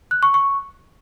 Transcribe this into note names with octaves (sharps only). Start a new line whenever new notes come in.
F#6
C#6
C#6